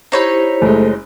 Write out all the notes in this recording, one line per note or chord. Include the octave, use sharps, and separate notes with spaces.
D#4 E4 G4 C5 C#5 B5
F#1 G#3 A3